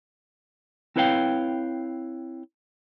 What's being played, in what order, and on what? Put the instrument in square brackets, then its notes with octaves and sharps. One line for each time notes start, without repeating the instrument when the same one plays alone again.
[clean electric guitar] C4 E4 B4 C#5 F5 G5